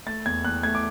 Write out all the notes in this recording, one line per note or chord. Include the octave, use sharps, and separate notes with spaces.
A3 A6
E2 G#6
E2 F#6
A3 G#6
D6